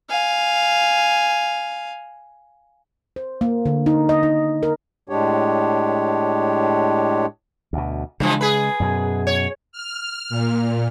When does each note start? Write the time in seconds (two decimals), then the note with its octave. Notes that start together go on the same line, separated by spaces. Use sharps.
0.10 F5 G#5
3.16 C5
3.41 A#3
3.66 D3
3.86 D#4
4.09 D#5
4.23 D#4
4.63 A#4
5.09 A2 G#3 D4 G4 C#5
7.73 D2 B2
8.20 G2 C#3 E3 F3 G#3
8.41 G#4 B4
8.80 F#2 B2
9.27 C#5
9.72 F6
10.29 A#2